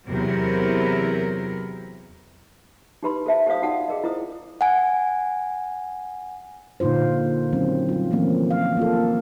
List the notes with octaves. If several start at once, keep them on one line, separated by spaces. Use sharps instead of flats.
E2 C3 F#3 E4 A#4
D#4 E4 G4 B4 B5 C6
A4 C5 E5 A5
G4 A4 C5 C#5 F5 D#6
D#4 F#4 D5 F#5 A5 D#6
G#4 A#4 D#5
E4 A#4 C5 D#6
F#5 G#5
A#2 D3 D#4 F4 C5
D#3 F#3 C4 C#4
G3 F4
E3 F3 A3 A#3 C4 C#4
F5
A#3 F4 A4